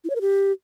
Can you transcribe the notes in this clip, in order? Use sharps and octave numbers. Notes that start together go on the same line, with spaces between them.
E4
C#5
A#4
G4